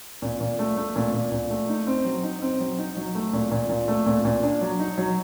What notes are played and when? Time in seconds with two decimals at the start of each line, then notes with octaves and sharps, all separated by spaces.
0.22 A#2
0.41 A#2
0.59 A3
0.77 A3
0.96 A#2
1.14 A#2
1.32 A#2
1.50 A3
1.69 D#4
1.87 C4
2.05 F#3
2.23 D#4
2.42 C4
2.60 F#3
2.78 D#4
2.97 F#3
3.15 A3
3.33 A#2
3.52 A#2
3.70 A#2
3.88 A3
4.06 A#2
4.25 A#2
4.43 D4
4.61 F#3
4.79 D#4
4.98 F#3